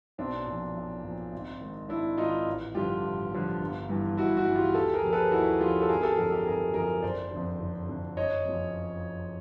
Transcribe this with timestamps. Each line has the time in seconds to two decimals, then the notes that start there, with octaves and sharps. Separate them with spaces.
0.18 B1 C4 D4
0.46 A#2
0.52 F3
0.76 B1
1.04 A#2 F3
1.32 G#1
1.61 G#2 D#3
1.89 G#1 D4 E4
2.17 G#2 D#3 D#4 F4
2.47 A1
2.75 G2 D3 F3 F4 G4
3.04 A1
3.31 G2 D3 F3
3.61 G1
3.89 G2 E3
4.17 G1 E4 F#4
4.36 E4 F#4
4.46 G2 E3
4.55 F4 G4
4.74 D#2 G4 A4
4.94 G#4 A#4
5.03 C#3 F3
5.13 A4 B4
5.31 D#2 E4 F#4
5.60 C#3 F3 F4 G4
5.82 A4
5.89 G#1 G#4 A#4
6.03 G4 A4
6.17 F#2 D3 F3 G#4 A#4
6.31 G4 A4
6.46 G#1 G#4 A#4
6.74 F#2 D3 F3 G#4 A#4
7.02 F#1 C5 D5
7.31 D3
7.36 F2
7.60 F#1
7.89 F2 D3
8.16 F#1 C#5 D#5
8.45 F2 C#3 F3